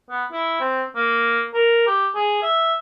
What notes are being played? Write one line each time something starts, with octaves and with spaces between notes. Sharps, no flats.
B3
E4
C4
A#3
A#4
G4
G#4
E5